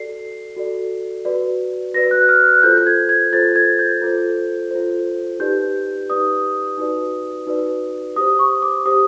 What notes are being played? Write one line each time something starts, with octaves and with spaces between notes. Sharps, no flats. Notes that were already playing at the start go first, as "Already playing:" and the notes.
Already playing: F#4 A4 D5 C7
F#4 A4 D5
F#4 B4 D5
F#4 B4 D5 A#6
F#6
F6
F#6
F4 A4 C5 G6
G6
G#6
G#6
F4 A4 C5 A6
G#6
G6
F4 A4 C5
F4 A4 C5
D#4 G4 B4 D5 G6
D#4 G4 B4 D5 D#6
D#4 F#4 B4 D5
D#4 F#4 B4 D5
G4 C5 D#6
C#6
D6
G4 C5 D#6